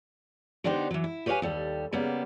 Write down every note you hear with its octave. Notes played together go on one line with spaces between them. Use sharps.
D3 B3 D4 D#4 G4 C5
E3 F#3
E4
G4 B4 C#5 D5 F5 G#5
D#2 G3 A4
C#3 G3 A#3 B3